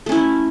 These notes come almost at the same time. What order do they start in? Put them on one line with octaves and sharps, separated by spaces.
A3 C#4 E4